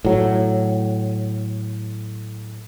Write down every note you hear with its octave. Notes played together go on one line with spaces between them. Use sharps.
A2 F#3